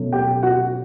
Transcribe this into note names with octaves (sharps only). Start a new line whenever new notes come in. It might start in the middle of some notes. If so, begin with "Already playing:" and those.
Already playing: B2 F#3 A3 C#4
G4 G5
F#4 F#5